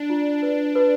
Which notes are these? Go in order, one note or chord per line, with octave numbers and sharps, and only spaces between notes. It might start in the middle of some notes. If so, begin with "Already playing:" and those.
Already playing: D4
F4
B4
B4